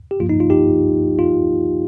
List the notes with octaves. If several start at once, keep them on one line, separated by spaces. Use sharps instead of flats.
G4
G2 F3 A#3 F4
D#4
F4
D#4 G4
F4